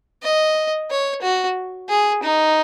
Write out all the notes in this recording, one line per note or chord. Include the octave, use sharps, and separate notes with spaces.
D#5
C#5
F#4
G#4
D#4